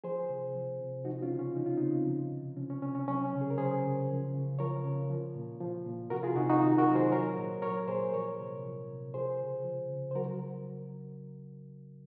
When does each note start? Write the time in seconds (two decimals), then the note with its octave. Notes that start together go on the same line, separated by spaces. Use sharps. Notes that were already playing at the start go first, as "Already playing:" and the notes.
0.04 F3 G#4 C5
0.29 C3
0.55 F3
0.81 C3
1.05 F3 D#4 F#4
1.22 C#4 F4
1.31 C#3
1.39 C#4
1.56 F3 D#4
1.66 F4
1.77 C#3 C4 D#4
2.07 F3
2.32 C3
2.56 F3 C#4
2.70 C#4
2.82 C3 C#4
2.95 C#4
3.08 F#3 C#4
3.33 C#3
3.41 G#4
3.50 A#4
3.58 F#3 G#4 C5
3.84 C#3
4.09 F3
4.34 C#3
4.59 F3 A#4 C#5
4.85 C#3
5.10 F3
5.36 A#2
5.60 F3
5.86 A#2
6.10 C3 F#4 A#4
6.23 F4 G#4
6.36 C3 D#4 F#4
6.49 D#4 F#4
6.62 D#3
6.78 F#4 A#4
6.86 F#3
6.95 G#4 C5
7.12 F#3 A#4 C#5
7.37 A#2
7.62 F#3 A#4 C#5
7.87 A#2 G#4 C5
8.13 F3 A#4 C#5
8.38 C3
8.64 F3
8.89 C3
9.14 F3 G#4 C5
9.39 C#3
9.64 F3
9.90 C#3
10.11 C5
10.15 F#3 F#4 A#4